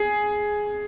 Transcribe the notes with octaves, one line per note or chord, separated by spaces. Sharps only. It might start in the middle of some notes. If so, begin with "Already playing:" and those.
Already playing: G#4